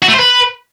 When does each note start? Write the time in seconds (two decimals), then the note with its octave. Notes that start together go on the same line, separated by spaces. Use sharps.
0.03 F#4
0.08 A3
0.14 C5
0.19 B4